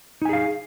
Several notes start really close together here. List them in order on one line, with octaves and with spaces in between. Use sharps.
D#4 G#5 G#4 F5